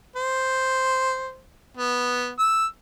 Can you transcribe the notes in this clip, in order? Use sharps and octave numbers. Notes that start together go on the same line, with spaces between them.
C5
B3
E6